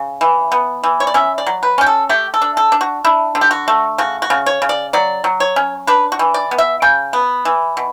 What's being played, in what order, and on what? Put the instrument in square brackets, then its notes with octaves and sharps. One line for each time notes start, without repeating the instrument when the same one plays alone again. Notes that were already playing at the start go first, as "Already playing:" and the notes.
Already playing: [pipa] C#3
E3
B3
E3
C#5
D5
C#4 E5
D5
F#3
B4
C#4 G4
A4
A3 G4
A4
D4
A4
D4
F#4
D4 E4
D3
G4
F#4
A3
C#3 F#4
F#4
C#3
C#5
C#3
D5
F#3 D5
F#3
C#5
C#4
D4 B4
F#4
E3
D5
B3
E5
C#3 G5
B3
E3
B2